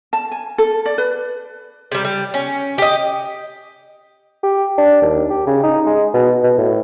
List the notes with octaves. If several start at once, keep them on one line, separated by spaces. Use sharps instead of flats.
A5
G#5
A4
D5
B4
C3 G3
G3
C#4
G4 D#5
G4
D4
D#2
G4
C#3
D#4
G#3
B2
B2
A2